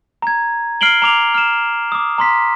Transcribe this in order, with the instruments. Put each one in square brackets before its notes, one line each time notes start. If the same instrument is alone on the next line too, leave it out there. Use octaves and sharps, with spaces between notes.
[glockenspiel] A#5 G#6
F6 C7 D7 F#7 G7
A#5 D6 F7
F6 E7
D6 D#6
A#5 C6 B6